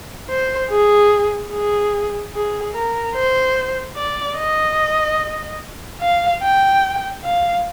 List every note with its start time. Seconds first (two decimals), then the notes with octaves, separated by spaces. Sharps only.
0.29 C5
0.70 G#4
1.52 G#4
2.33 G#4
2.74 A#4
3.15 C5
3.96 D5
4.37 D#5
6.00 F5
6.42 G5
7.24 F5